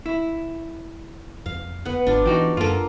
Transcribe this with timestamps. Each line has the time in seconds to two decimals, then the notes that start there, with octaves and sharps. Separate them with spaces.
0.06 E4
1.46 F2 F5
1.85 B3 F#5
2.07 G#1 D4 F4
2.26 E3 D#4 F#4 G4
2.57 F#2 A#3 F4 A4 A#4